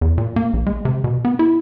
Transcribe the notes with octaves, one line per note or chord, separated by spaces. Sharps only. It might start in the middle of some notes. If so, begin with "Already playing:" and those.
E2
A#2
A#3
A#1
G#3
C3
B2
B3
E4